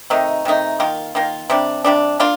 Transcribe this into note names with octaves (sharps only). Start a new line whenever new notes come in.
C3 D#3 A3 D#4
C3 D#3 A3 D#4
D#3 A#3 F4
D#3 A#3 F4
C3 G3 D4
C3 G3 D4
A#3 D4 F4